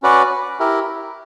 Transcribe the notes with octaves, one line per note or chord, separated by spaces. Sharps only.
C#4 F#4 B4 D5
E4 G4 A#4